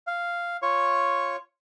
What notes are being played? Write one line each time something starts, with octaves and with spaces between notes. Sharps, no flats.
F5
F4 C#5 C#6